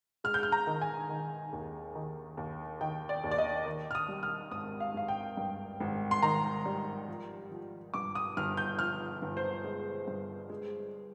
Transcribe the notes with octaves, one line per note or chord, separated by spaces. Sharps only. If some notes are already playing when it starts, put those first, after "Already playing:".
G#3 F6
G6
F6
A#5
D#3
G#5
D#3
D#2
D#3
D#2
D#3 G5
D5
D#2
D5
D#5
D#3
F6
D#6
G3
F6
G#1 D#6
F5
G#1 F5
G5
G2
G#1
C6
D#3 A#5
G3
F3
F3
G2 D6
D#6
G1 F6
G6
F3 F6
G1
C5
G#3
G2
G#3